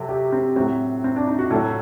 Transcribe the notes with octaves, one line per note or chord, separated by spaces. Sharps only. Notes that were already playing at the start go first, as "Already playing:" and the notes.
Already playing: C3 F#3 A4
G4
C4
A2 F#3 C4
C4
D4
D#4
F#4
A2 F#3 A4